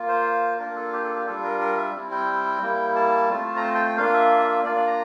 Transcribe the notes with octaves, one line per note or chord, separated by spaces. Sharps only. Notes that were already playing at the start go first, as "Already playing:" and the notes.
Already playing: A#3 F4
C5
A#3 D4 F4 A#4
A4
G4
A4
G4
G3 D4 F4 A4
A#4
A#4
E5
G3 C4 E4
G5
G3 A#3 E4
A5
A3 C4 F4
A#5
A5
G5
G5
A#3 D4 F4 F5
E5
A#3 D4 F4 D5
D5
A#5